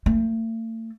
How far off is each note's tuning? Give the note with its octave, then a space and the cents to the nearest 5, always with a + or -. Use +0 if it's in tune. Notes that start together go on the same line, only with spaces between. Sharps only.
A3 +45